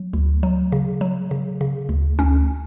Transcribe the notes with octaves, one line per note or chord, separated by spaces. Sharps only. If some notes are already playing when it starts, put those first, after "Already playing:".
Already playing: F#3
D2
F#3
C#3
F#3
C#3
C#3
D2
D2 C#4